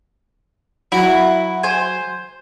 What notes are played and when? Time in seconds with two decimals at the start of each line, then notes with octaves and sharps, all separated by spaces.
0.92 F#3 E4 F#4
1.63 C5 G#5